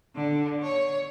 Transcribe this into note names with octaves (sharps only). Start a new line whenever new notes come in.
D3
C#5